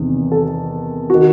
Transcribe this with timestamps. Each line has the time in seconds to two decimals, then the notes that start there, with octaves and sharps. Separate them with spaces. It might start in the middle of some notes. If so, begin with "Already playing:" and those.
Already playing: E2 C3 D#3
0.32 A4
1.10 D#3 F#4